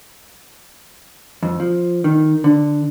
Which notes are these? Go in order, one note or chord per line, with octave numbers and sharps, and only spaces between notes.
F2
F3
D#3
D3